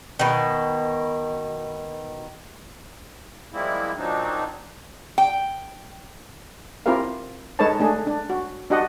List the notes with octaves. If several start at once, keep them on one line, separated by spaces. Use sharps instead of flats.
B2 D#3
F3 G3 G#3 A#3 C4 E4
A#2 F#3 C4 D4 D#4
G5
C4 E4 F4 G4 A#4 F5
G#3 D#4 A4 B4 C#5 A5
A3 D4 G#4
D4
F#4
D4 F#4 G4 D#5 F#5